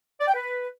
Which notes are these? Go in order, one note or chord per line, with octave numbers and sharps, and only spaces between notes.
D5
G5
B4